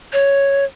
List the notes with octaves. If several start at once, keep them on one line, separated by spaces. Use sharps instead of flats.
C#5